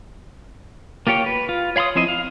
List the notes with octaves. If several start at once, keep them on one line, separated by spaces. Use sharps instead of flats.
A#3 F4 G4 C#5 G5
B4
F4
C#5 F5 B5 C6 D#6
F3 C4 E4 C5 D#5
F5